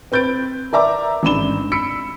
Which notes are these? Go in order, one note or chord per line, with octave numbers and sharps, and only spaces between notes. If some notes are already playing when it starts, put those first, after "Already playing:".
C4 B4 G6 A6 D7
A#4 D5 E5 A#5 D6
A1 G#2 D4 B5 E7 G7
B5 E6 B6 C#7 D7